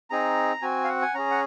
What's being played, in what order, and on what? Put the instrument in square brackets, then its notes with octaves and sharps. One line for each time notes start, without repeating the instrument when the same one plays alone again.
[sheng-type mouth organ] C4 D#4 G#4 A#5
C4 F#4 G#5
F5
F#5
G#5
C#4 G#4 A#5
F#5